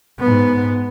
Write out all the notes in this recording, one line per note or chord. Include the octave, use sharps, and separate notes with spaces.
G#2 B3